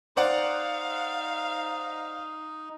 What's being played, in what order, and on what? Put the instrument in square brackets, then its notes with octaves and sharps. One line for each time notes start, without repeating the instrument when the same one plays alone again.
[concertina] D#4 [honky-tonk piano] C5 D5 F#5 [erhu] F5